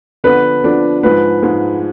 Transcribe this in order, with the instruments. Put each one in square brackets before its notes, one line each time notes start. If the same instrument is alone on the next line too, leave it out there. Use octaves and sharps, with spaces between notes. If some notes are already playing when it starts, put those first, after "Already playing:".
[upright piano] D3 F3 B3 D4 [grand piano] B4
[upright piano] D3 F3 B3 D4
[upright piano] G#2 F3 G#3 [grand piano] B4
[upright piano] G#2 F3 G#3